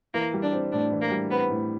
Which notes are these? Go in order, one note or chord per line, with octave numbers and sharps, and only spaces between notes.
E3 A#3
G3
D4
C4
A2 D4
E3
A#3
G3
B3 C4
A2